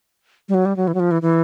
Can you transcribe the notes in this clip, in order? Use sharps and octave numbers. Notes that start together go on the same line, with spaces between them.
G3
F#3
G3
F#3
E3
F#3
F3
E3
E3